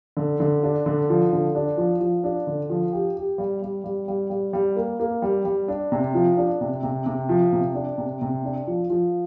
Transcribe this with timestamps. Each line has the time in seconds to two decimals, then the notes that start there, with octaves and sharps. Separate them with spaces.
0.17 D3
0.40 D3
0.63 D4
0.86 D3
1.10 F3
1.33 D3
1.55 D4
1.77 F3
2.01 F3
2.24 D4
2.47 D3
2.70 F3
2.92 G4
3.16 G4
3.38 G3
3.62 G3
3.84 G3
4.08 G3
4.30 G3
4.53 G3
4.76 A#3
5.00 A#3
5.22 G3
5.45 G3
5.68 D4
5.92 C3
6.14 F3
6.37 D4
6.61 C3
6.83 C3
7.06 C3
7.29 F3
7.52 C3
7.75 D4
7.98 C3
8.21 C3
8.45 D4
8.67 F3
8.90 F3